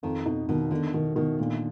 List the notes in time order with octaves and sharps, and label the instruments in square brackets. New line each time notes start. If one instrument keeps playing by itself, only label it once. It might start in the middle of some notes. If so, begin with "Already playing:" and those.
[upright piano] F2 [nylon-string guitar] D#3
[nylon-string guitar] B2 [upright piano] D#4
[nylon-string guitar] B2 [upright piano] D#3
[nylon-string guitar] D3 [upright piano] D#3
[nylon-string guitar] B2 [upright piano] D#3
[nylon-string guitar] B2 [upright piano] D#3
[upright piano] A#2 [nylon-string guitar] D3